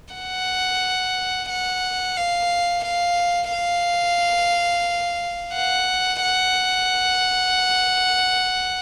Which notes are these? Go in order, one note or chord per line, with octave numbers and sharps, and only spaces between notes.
F#5
F#5
F5
F5
F5
F#5
F#5